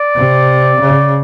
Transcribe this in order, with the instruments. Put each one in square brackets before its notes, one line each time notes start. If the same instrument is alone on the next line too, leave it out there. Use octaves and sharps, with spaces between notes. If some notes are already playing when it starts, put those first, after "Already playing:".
Already playing: [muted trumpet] D5
[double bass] C3
C#3